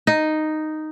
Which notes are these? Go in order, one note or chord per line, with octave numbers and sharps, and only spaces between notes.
D#4